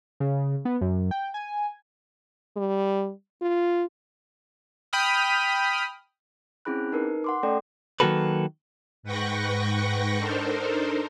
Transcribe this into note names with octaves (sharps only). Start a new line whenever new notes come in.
C#3
B3
F#2
G5
G#5
G3
F4
G5 B5 D#6 F6
C4 C#4 E4 G#4 B5 F#6
D#4 A#4 B4
F#5 C6 D6
A3 C#4 A4 D5 G5
D#3 F#3 A#3 F#4 A4 B4
G#2 B4 F#5 G5 C#6 A#6
D4 D#4 A4 A#4 C5